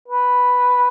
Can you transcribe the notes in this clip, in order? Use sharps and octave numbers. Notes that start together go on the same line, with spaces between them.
B4